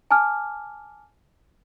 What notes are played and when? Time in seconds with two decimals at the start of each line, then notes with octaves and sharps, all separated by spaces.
0.11 G#5 A5 D6 F6